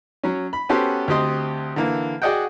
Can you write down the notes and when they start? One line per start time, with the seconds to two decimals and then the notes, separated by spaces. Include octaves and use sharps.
0.24 F#3 C#4
0.53 B5
0.69 B3 C#4 F#4 G4 A4 C5
1.08 D2 C4 G4 D#5 C6
1.76 D3 E3 A#3
2.22 F#4 G#4 D5 D#5 F#5 G5